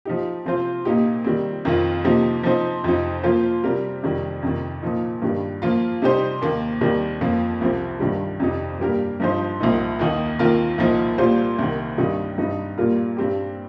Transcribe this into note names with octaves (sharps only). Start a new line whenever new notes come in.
F3 D#4 G4
C3 F3 C4 F4 C5
A#2 A#3 D#4 G4
D#3 G3 C4
F2 D#3 C4 F4
C3 F3 A#3 D#4 G4
F3 C4 D#4 C5
F2 C3 F3 C4 D#4
F3 A#3 F4 C5
C3 G3 C4 G4 A#4
F2 C3 D#3 G3
F2 C3 D#3
A#2 F3 D#4
G2 D#3 G3
F3 A#3 F4
C3 G3 D#4 G4 C5
D#2 D#3 A#3
D#2 D#3 G3 C4
F2 F3 A#3
C2 C3 F3 C4
G2 D#3 G3
F2 C3 G3 C4 D#4
G2 G3 A#3 G4 A#4
G2 F3 D#4 C5
C2 A#2 F3 D#4
D#2 D#3 A#3 D#4
D#2 D#3 C4 F4 A#4
C2 A#2 F3 D#4
A#2 G3 A#3 F4 C5
C2 C3 D#3
G2 D#3 G3 C4 D#4
G2 G3 C4 D#4
A#2 G3 A#3 F4 A#4
G2 G3 C4 G4